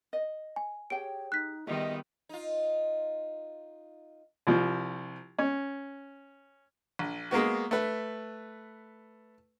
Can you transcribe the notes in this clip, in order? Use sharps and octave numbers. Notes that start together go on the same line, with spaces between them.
D#5
G#5
G4 G#4 C#5 G5 D7
D#4 F#6 B6
D#3 G3 B3 F4 G#4 D#5 E5
D#4 F4
C2 F3
C#4
A#1
G#3 A#3 B3 F#4
A3 B4